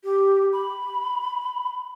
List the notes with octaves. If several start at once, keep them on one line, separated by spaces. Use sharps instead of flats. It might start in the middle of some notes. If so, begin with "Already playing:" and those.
G4
B5